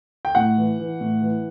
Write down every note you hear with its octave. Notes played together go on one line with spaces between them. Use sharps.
G5
A2 F#5
E3
E3
A2
E3